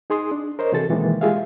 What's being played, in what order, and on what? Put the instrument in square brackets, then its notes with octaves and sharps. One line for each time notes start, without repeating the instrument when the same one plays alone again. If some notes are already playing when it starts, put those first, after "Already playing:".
[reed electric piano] D#4 G#4 C6 D#6
D4
A#4 C5 C#5 D#5
C3 E3 F#4 G#4 A4 A6
B2 D#3 E3 G#3 A#3 B3
G#3 F4 G4 G#4 E5 F5